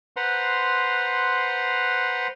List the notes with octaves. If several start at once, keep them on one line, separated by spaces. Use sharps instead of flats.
B4 C5 F#5 A#5 C6